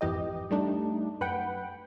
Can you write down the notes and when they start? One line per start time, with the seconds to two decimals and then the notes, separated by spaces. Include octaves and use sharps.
0.01 G#1 F2 E3 G4 D#5
0.51 G3 A3 D4 D#4
1.21 F#2 B4 F#5 G5